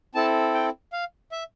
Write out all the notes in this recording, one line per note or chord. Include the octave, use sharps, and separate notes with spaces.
C4 E4 A4 A5
G5
F5
E5